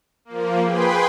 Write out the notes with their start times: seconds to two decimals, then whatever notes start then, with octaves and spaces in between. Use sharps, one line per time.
0.25 F3 A#3
0.62 G#4 B4 G5 B5 C6